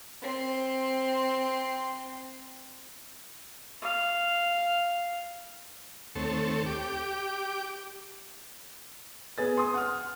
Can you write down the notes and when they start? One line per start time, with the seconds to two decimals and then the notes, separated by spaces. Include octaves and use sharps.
0.22 C4 C6
3.82 F5
6.15 D#2 A3 C4 A4 C#5
6.66 G4 D6
9.38 B3 G#4 A6
9.57 C6 D#6
9.74 F#5 F6